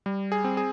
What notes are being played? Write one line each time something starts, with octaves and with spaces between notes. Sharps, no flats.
G3
G#4
C4
G#4